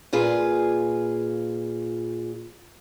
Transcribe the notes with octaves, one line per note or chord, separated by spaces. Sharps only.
A#2 F4 G#4 B4